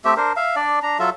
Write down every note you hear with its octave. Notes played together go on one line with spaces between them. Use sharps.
A3 C4 G4 E5
D4 A#4 C5
E5 F5
D4 D5
D4 A#5
F#3 F4 A4 E5